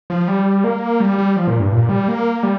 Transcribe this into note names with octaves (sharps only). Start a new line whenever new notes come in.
F3
G3
A#3
G3
G3
F3
A#2
G2
A#2
G3
A#3
G3